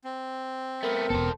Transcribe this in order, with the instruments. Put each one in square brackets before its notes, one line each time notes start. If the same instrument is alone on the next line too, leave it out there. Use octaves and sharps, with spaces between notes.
[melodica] C4
[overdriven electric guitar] A3 B3 [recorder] A#4
[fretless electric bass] E1 D#2 B3 [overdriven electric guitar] A4 C5